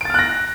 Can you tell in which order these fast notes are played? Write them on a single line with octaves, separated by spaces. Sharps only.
D7 A6 F6 F#6 A#6